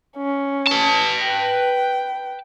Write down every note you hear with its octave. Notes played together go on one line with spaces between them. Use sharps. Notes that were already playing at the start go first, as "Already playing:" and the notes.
C#4
B4 A5
G5